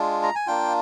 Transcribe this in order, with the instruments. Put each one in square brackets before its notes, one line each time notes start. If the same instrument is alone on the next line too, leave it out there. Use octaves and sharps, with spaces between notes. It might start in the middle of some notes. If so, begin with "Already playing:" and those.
Already playing: [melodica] G#3 D4 F4
A#5
G#5
A#3 D4 F4 G5